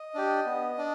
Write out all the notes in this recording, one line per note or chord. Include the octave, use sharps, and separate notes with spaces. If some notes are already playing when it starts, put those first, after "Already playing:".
Already playing: D#5
D4 G4
B3
D4